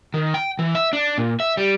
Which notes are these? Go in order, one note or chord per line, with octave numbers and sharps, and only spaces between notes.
D#3
G5
E3
E5
D4
A#2
E5
G3